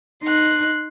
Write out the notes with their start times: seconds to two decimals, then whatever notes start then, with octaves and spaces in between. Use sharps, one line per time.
0.23 D#4 C6 F#6